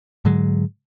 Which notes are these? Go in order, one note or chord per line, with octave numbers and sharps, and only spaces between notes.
G#2 D3 F#3 G#3